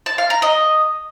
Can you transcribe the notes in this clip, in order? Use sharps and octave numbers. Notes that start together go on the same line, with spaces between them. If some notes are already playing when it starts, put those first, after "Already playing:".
A5
F5
A#5
D#5